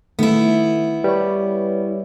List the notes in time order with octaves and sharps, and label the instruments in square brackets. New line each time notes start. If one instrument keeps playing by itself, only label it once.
[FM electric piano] D#3 A3 [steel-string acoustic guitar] B3 E4
[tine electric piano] G3 [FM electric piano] B4 C#5